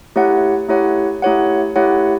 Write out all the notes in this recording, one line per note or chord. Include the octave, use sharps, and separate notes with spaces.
A3 E4 G4 C#5 F#5
A3 E4 G4 C#5 F#5
A3 E4 G4 C#5 F#5
A3 E4 G4 C#5 F#5